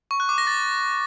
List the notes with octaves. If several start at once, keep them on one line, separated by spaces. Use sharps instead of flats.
C#6
F#6
D6
A#6
A6